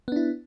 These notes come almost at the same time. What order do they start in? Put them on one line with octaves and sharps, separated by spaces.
B3 D4 E4